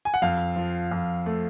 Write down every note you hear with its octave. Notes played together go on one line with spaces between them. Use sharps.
G#5
F#5
F2 F5
F3
F2
A3